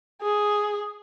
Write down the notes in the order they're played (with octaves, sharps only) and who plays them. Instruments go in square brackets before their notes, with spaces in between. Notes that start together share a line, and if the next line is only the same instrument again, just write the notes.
[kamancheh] G#4